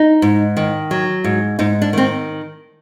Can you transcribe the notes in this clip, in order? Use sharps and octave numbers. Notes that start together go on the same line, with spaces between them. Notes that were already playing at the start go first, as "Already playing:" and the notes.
Already playing: D#4
G#2
D#3
F#3
G#2
G#2 D#4
D4
D#3 C4